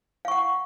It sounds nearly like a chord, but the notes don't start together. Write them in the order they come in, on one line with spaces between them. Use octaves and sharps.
F5 C#6 F#5